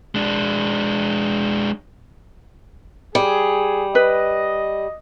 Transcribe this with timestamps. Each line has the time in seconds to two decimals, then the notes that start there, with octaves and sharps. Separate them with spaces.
0.15 G#3 D4
3.15 G3 G#4
3.95 B4 D#5